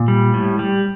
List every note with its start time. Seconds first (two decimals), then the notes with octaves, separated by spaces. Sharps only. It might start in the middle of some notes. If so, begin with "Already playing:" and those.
Already playing: A#2
0.08 G3
0.34 A2
0.59 G3